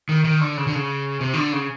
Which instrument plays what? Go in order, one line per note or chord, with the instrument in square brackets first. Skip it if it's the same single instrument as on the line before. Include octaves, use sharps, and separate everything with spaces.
[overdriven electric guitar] D#3
D#3
D3
C#3
D3
C#3
C3
D#3
D3
C#3